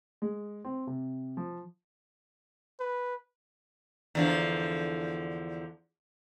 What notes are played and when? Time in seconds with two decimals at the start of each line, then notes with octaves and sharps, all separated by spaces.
0.22 G#3
0.65 C4
0.87 C3
1.37 F3
2.79 B4
4.15 E2 D3 F3